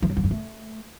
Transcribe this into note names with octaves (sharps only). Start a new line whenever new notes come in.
E3
F#3
F3
G2
A3